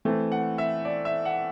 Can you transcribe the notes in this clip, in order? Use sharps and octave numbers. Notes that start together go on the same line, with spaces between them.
E3 A3 C4
F#5
E5
D5
E5
F#5